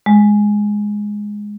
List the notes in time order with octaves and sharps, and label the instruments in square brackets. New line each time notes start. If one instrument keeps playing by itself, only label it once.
[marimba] G#3